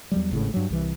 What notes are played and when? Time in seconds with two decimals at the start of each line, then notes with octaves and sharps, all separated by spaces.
0.11 E2 F#3 G3
0.31 G#1 A2 C#3
0.54 G2 F#3
0.70 C2 E3